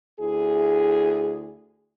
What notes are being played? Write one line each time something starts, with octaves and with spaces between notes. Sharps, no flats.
D2 E4 G#4